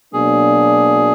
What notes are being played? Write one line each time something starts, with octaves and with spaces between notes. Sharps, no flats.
B2 F#3 A#3 D4 G#4